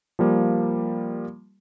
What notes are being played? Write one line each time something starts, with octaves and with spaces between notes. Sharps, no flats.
F3 G3 A#3